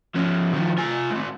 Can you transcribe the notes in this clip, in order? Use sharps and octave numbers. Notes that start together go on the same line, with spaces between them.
F3 C#4
D#3 F3
F4 G#5
G#3 C4